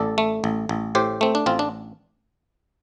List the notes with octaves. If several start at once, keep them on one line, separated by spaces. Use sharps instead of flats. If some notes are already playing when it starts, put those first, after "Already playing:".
Already playing: A1 A4 D5
A3
A1
A1
A2 G4 C5
A3 C4
D4
A1 C4 F4
D4